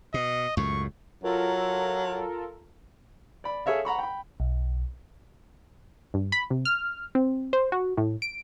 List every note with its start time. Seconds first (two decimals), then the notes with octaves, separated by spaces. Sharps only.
0.14 B2 D#5
0.57 C#2 F#2 A2 C#6
1.24 F#3 F4 A4 A#4
3.44 D5 B5
3.66 G#4 A4 C#5 E5 F5
3.85 F#5 A#5 B5 C#6
3.99 G5 B5
4.40 B1
6.14 G2
6.32 B5
6.50 C3
6.65 F6
7.15 C4
7.53 C5
7.72 F#4
7.97 A2
8.22 D7